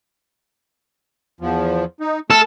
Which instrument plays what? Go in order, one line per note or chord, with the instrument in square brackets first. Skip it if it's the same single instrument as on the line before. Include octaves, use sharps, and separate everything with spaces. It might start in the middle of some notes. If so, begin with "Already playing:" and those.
[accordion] E2 F3
D#4
[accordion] A3 F6 [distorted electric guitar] A4